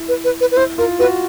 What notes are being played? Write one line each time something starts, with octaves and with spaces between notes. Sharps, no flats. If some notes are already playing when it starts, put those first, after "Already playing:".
Already playing: E4
B4
B4
B4
B4
E4 C5
F4 A#4
F#4 B4